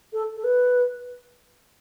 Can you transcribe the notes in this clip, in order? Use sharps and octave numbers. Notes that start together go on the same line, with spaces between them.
A4
A4
B4